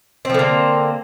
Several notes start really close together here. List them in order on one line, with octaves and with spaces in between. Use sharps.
C4 F3 D3 A#3